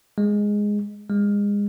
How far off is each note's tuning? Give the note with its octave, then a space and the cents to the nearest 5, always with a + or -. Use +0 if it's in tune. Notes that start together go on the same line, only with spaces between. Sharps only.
G#3 -5
G#3 -30